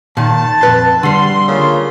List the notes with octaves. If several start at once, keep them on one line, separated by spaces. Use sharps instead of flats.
A#2 D#3 A5
F2 B4 C6
D3 G3 C6
C#3 A#3 F4